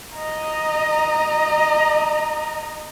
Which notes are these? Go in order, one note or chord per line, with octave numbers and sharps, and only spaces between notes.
D#5 A#5